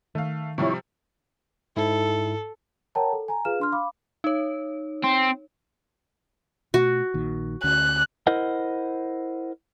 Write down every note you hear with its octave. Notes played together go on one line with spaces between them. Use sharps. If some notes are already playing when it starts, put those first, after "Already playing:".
D#3 A3 F5
C3 F3 G3 E4 C#5
G#2 E4 A4
A#4 C#5 F#5 G5 A5 A#5
A4
G#5 A#5
F4 G#4 B4 F5 F6 E7
D4 C6 F6
F5 B5 D6
D#4 C#5
C4
B2 A3 F#4
A#1 A#2 D#3
D2 D3 C#4 F#6
E4 A#4 C5 D#5 F#5